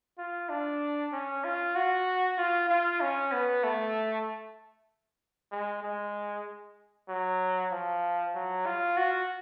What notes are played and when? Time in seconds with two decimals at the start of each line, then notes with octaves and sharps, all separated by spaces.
0.18 F4
0.50 D4
1.13 C#4
1.44 F4
1.75 F#4
2.38 F4
2.69 F4
3.01 C#4
3.32 B3
3.64 A3
5.52 G#3
5.83 G#3
7.09 F#3
7.72 F3
8.35 F#3
8.66 F4
8.97 F#4